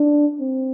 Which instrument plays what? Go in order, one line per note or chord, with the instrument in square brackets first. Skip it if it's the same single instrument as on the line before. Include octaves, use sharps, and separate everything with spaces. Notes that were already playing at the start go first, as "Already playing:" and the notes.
Already playing: [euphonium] D4
C4